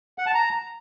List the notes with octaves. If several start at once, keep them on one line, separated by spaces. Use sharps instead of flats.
F#5
A5
A#5